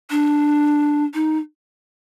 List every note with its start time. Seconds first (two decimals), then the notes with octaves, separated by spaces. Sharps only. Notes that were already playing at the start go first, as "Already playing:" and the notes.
0.11 D4
1.14 D#4